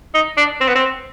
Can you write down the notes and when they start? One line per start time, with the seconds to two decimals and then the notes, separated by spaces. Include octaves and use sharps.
0.14 D#4
0.37 D4
0.61 C4
0.68 B3
0.75 C4